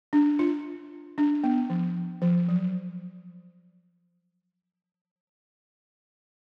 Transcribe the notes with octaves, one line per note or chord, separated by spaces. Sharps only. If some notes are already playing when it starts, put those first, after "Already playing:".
D4
F4
D4
B3
F3
F3
F#3